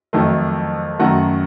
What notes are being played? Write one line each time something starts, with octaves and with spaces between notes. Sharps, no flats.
F2 D#3 F#3 A3
F#2 D#3 A3 F#4 F#5